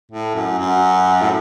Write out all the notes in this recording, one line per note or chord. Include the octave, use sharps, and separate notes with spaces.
A2
F#2
F#2
A2